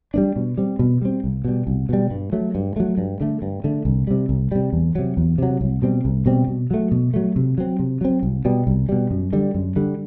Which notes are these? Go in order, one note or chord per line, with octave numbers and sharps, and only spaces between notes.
G3 B3 D4
B2
G3 C4
B2
G3 C4
C2
B2 G3
C2
B2 G3
G2
F#3 A3
G2
F#3 A3
G2
D3 A3
G2
D3 A3
C2
C3 G3
C2
C3 G3
E2
C3 F#3
E2
C3 F#3
C2
B2 G3 C4
C2
B2 G3 C4
B2
F#3 A3
B2
F#3 A3
C3
F#3 C4
C3
F#3 C4
C2
B2 G3
C2
B2 G3
F#2
D3 G3
F#2
D3 G3